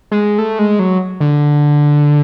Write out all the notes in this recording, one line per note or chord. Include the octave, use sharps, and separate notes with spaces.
G#3
A3
G#3
F#3
D3